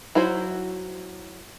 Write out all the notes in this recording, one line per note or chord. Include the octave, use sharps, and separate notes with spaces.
F#3 E4 F#4 C5